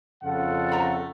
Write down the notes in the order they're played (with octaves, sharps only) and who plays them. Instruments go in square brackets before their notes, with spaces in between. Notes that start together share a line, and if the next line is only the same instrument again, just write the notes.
[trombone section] F2 C#3 [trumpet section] F4 F#5 [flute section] A4
[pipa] A3 A#5 B5